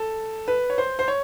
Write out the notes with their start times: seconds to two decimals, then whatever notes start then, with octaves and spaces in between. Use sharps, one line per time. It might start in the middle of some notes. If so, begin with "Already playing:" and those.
Already playing: A4
0.48 B4
0.70 C#5
0.78 C5
0.99 C5
1.08 C#5